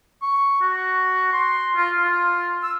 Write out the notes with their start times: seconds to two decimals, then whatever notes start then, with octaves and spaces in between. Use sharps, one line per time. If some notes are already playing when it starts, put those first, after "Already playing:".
0.22 C#6
0.61 F#4
1.33 C6
1.76 F4
1.98 F4
2.63 E6